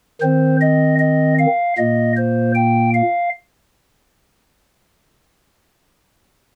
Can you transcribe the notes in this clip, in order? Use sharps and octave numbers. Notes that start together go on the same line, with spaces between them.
D#3 C4 C5
D#5
D#5
F5
A#2 A#3 D#5
C5
G5
F5